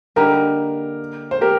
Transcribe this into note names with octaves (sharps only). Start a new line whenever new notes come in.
D3 G3 A#3 D#4 G4 A#4
C5
G4 A#4